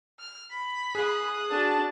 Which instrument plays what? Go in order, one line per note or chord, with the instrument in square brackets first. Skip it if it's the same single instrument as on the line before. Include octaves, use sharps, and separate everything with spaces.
[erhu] F6
B5
[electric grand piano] G#4 [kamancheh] D#6 F#6
[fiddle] D4 F#4 [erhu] A5